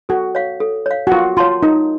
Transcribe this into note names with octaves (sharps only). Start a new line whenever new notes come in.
F#4 A4
C#5 F5
A4
C#5 F5
F#4
F4 A#4
F4 C#5 A5 C6
D#4 A#4